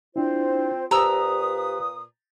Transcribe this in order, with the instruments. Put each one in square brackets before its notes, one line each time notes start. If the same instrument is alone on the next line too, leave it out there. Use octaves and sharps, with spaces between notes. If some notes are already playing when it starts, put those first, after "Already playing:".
[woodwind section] C4 F4 C5 [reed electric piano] D4 E4
[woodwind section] A#2 B4 D#6 [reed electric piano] G4 C5 [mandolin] A#5 E6